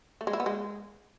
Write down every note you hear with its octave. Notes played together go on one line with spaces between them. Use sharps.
A3
G#3
E4
B3
G#3